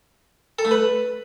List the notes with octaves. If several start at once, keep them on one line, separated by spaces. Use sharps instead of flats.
A4
A3
B4